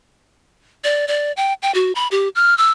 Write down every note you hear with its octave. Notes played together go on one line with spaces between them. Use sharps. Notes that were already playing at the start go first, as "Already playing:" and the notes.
D5
D5
G5
G5
F#4
B5
G4
F6
E6